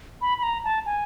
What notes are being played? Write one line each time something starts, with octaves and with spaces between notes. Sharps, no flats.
B5
B5
A#5
A5
G#5